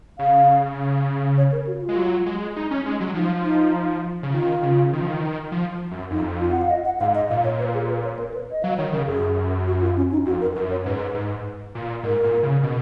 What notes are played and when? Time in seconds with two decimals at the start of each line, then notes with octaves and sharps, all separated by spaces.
0.18 C#3 F5
1.37 C#5
1.52 A#4
1.67 F#4
1.82 F4
1.89 G#3
1.96 F#3
2.26 G#3
2.56 D#4
2.71 C#4
2.86 G#3
3.00 F#3
3.14 F3 D#4
3.45 D#4
4.23 C#3
4.34 D#3 F4
4.63 C#3
4.93 D#3
5.01 F3
5.07 D#3
5.52 F3
5.91 F#2
6.11 F2 D#4
6.41 F4
6.52 F#5
6.61 F5
6.70 D#5
6.85 F#5
7.00 G#2 F5
7.15 D#5
7.30 A#2 F5
7.44 C#5
7.59 B4
7.74 G#4
7.89 B4
8.04 C#5
8.19 A#4
8.34 B4
8.51 D#5
8.63 F#3 F5
8.78 D#3 C#5
8.92 C#3 A#4
9.07 F#2 G#4
9.67 F#4
9.81 F4
9.97 C#4
10.12 D#4
10.26 F2 F#4
10.41 A#4
10.56 F#2 A#4
10.71 C#5
10.85 G#2 B4
11.14 G#2
11.75 A#2
12.03 G#2 A#4
12.24 A#2
12.43 C#3
12.63 B2